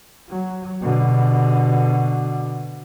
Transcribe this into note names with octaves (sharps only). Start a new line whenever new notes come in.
F#3
B2 D3